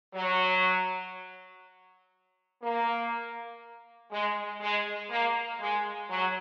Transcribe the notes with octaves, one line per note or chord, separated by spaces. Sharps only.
F#3
A#3
G#3
G#3
A#3
G#3
F#3